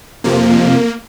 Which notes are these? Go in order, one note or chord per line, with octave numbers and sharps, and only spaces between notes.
F2 C3 F3 A#3